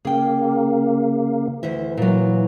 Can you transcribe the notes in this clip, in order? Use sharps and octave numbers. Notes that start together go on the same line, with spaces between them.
C#3 A#3 G#4 G5
D2 E3 C5 E5
A#2 F#3